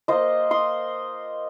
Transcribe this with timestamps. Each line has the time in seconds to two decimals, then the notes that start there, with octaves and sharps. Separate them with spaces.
0.08 A#3 F4 C5 D#5
0.51 C6 D#6